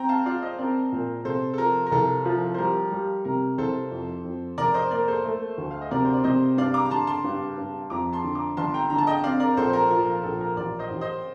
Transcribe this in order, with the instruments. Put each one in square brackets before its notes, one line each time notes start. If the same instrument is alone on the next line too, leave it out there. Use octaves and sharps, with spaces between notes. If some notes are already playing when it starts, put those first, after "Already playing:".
Already playing: [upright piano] C4 [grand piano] G5 A#5
[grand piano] F5 A5
[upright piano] F4 [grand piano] D5 F5
[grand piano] C5 D#5
[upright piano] C4 [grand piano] A#4 D5
[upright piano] A#2
[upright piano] C3 [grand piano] A4 C5
[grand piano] A4
[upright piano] F3 [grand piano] A#4
[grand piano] A#4
[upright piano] C2 [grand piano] A4
[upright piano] F3
[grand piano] C5
[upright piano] G3 [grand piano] A#4
[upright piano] G3
[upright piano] C3 [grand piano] A#4
[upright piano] C2 [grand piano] A4 C5
[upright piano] F2
F2
[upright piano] F1 [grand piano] A#4 D5
[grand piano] C5 D#5
[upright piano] A#3 [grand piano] A#4 D5
[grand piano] A4 C5
[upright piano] A3
D2
[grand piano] F5
D#5
[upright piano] C3 [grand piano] A#4 D5
[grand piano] C5
D5
[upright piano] C3 [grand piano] C5 D#5
[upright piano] G2 [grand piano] D5 F5
[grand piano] A#5 D6
A#5
[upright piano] D3 [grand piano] A5 C6
[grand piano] A5 C6
[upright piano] G2
G2
[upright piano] F2 [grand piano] A#5 D6
[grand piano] A5 C6
[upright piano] D3
[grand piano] A#5 D6
[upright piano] G1 [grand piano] A5 C6
[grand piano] G5 A#5
[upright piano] D3 [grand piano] A#5
[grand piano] A5
D#5 G5
[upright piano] C4 [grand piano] D5 F5
[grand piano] A#4 D5
[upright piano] A#1 [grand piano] A4 C5
[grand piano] C5
A#4
[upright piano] F3 [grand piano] A#4
[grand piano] A#4
[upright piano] A#1 [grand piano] A4
[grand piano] A#4
[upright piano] A1 [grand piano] A#4 D5
[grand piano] C5 D#5
[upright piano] A1
[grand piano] C5 D#5